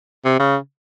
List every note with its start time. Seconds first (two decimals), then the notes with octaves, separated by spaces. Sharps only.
0.25 C3
0.39 C#3